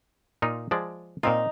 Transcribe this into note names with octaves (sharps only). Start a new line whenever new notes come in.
A#2 D#4 F4
F3 G#3 D5
A#2 C4 D#4 F4